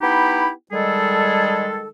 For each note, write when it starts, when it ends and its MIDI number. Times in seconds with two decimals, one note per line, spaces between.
0.01 0.50 59
0.01 0.50 63
0.01 0.50 64
0.01 0.50 67
0.01 0.50 79
0.01 0.50 83
0.72 1.87 51
0.72 1.87 55
0.72 1.87 56
0.72 1.87 68
0.72 1.87 69